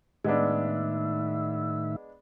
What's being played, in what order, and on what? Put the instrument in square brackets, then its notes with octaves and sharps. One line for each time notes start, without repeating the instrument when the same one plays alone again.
[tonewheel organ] A2 D#3 E5 [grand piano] G#3 B3 D4